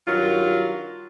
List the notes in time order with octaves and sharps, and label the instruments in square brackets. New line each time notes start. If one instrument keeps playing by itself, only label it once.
[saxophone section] G2 D#3 F#3 F4